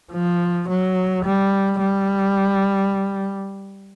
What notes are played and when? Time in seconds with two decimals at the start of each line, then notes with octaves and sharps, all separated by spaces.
0.13 F3
0.68 F#3
1.25 G3
1.80 G3